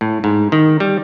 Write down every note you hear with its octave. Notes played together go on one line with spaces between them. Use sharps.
A2
G#2
D#3
G3